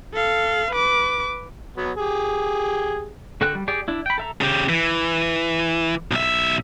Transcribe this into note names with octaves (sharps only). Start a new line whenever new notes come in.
A4 F5
B4 D6
F#3 B3
G4 G#4
D3 F#4 A4 G5 F#6
G3
G4 G#4 D5
D4 E4
G5 B5
A4 E5 A#5
C#3 G4
E3
B1 E5